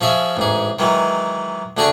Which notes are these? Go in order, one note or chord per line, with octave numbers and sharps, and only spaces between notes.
F3 C#4 G#4 E5
A1 G#2 G#4
D#3 E3 F#3 G#3
D2 D3 D4 G#4 G5 C#6